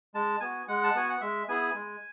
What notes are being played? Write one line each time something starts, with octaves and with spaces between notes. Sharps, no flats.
G#3 A5
B3 F#4 G#5
G#3 F#5
A5
B3 F#4 G#5
F#5
G#3 E5
B3 E4 G#4 G#5
G#3